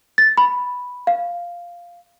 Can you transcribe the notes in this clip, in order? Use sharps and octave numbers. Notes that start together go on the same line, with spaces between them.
A6
B5
F5